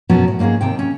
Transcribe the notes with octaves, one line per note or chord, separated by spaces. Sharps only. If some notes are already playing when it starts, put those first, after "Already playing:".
F#2 B2 F#3 B3 C#4 F#4
A2
G#2 A#3 C4 C#4 G#4
D#2 C3 G5
C#4